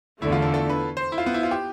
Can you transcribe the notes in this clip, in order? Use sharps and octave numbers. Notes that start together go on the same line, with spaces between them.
E2 D3 A3 E4
F4
A4
A4
B4
C5
E4
F4
B3
E4
F4
G4